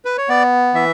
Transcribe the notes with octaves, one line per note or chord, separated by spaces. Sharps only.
B4
C#5
B3 D5
E3 E5